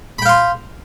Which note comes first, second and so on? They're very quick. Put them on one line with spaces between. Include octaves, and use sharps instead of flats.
B5 G5 F5 C6